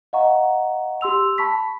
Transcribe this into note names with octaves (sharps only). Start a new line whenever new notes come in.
D#5 F5 F#5 A#5 C#6
G4 C6 E6 F7
A5 B5 C#6 B6